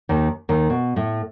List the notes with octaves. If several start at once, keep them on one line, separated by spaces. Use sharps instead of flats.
D#2 D#3
D#2 D#3
B2
A2 A3